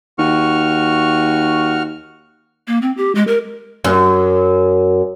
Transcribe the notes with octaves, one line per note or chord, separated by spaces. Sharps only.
D#2 F#4 C#6 F6
A#3
C4
G4
G#3
A#4
F#2